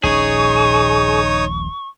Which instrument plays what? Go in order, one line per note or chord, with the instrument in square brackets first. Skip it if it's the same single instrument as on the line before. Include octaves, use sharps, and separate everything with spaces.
[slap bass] D#1 A#1 C#4 [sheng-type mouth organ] D#4 C#5 D#6 [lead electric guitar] G#4 [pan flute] C#6